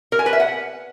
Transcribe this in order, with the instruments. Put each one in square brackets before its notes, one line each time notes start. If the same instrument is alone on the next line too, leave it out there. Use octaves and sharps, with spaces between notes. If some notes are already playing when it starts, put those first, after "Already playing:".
[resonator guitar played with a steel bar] A#4
G#5
B4
E5
F#5